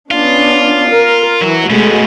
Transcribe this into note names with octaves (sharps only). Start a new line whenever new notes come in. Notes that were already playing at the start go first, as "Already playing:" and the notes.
B3 C#4 D4 F4
A#4
E3 F#3 F#4
B2 G#3 A3 C#4 F#4